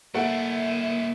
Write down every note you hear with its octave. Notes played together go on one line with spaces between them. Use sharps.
A3 A#3 E4 E5 F#5